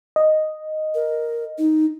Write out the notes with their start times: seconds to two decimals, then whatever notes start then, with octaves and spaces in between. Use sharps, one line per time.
0.16 D#5
0.95 A#4
1.58 D#4